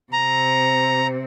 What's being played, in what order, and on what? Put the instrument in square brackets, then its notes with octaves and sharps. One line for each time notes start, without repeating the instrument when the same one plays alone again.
[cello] C3 C4 [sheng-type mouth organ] A#5